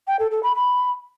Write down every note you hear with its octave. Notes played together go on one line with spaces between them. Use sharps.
G5
A4
A4
B5
B5